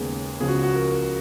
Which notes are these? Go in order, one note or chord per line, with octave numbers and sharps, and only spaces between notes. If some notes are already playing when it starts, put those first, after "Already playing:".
Already playing: D#2 C#3 G#3 B3 G#4
C#2 C#3 F3 B3 G#4
F#4
F#4
A#4